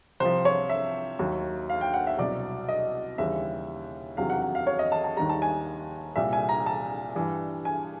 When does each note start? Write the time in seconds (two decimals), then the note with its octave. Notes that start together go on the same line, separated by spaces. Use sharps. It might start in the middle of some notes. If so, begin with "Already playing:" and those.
0.20 C2 C3 F3 C5
0.45 C#5
0.69 E5
1.19 D#2 D#3 F#3
1.70 F5
1.81 G5
1.94 F#5
2.07 E5
2.18 C2 B2 F#3 D5
2.69 D#5
3.18 D#2 C#3 E3 G3 E5
4.17 E2 C3 D#3 F#3 F5
4.30 F#5
4.42 F#5
4.55 F5
4.67 C#5
4.79 D#5
4.92 A5
5.04 A5
5.16 D#2 D#3 G3 A#5
5.29 A5
5.42 G#5
6.16 C2 A#2 G3 E5
6.33 G#5
6.49 A#5
6.66 A5
7.15 G2 E3 G3
7.65 G#5